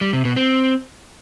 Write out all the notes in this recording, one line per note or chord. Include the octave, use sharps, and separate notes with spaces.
G3
C3
B2
C4